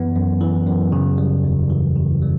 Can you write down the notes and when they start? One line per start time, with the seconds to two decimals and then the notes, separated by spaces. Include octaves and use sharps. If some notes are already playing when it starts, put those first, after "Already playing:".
Already playing: F#2 E3 B3
0.16 F#2
0.41 E3
0.67 F#2
0.92 C#3
1.18 G3
1.44 E2
1.70 E3
1.96 C#3
2.22 G3